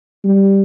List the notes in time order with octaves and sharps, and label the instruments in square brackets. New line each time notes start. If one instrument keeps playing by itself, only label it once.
[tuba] G3